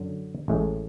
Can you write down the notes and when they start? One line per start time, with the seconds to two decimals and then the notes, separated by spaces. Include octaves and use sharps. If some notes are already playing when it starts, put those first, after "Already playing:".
Already playing: F#2 D3 F#3
0.48 A1 A2 G#3